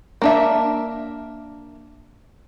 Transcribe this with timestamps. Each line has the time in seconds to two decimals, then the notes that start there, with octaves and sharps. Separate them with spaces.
0.22 A#3 D4 E5